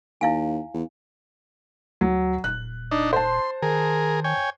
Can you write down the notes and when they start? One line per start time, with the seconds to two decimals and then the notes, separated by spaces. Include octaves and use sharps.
0.21 D#2 E4 F5 G#5
0.74 E2
2.01 D2 F#3
2.44 D#1 F#6
2.91 D4 D#4
3.13 C5 A5 C6
3.62 D#3 G#4 A#4
4.24 C#5 G5 G#5